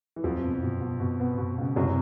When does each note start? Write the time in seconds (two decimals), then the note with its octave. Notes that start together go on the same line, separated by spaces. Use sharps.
0.16 E3
0.24 F2 F3 F#3
0.43 B2
0.63 B2
0.81 B2
1.00 B2
1.20 B3
1.38 B2
1.58 C#2
1.76 C2 F#2 F#3